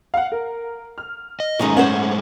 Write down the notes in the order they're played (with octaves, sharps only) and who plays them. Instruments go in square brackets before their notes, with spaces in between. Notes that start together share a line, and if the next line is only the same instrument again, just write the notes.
[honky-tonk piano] F5 F#5
A#4
F6
[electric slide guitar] D#5
[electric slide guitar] G#2 G#3 A3 [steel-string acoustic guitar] D#3 C#4 D#4
[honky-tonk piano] C#4 [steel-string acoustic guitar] C5 C#5 F#5